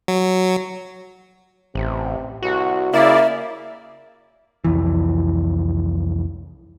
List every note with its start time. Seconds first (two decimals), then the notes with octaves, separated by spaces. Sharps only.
0.08 F#3
1.75 A1 C3
2.43 C2 F#4
2.94 C#3 A#3 E4 D5 E5
4.65 C2 F2 E3